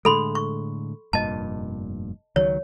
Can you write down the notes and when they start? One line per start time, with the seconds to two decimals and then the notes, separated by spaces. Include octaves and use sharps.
0.05 A2 D3 G#3 A4 B5 C6
0.35 C#6
1.13 F1 G2 A#2 D#5 A5
2.36 C#2 D#3 F#3 C#5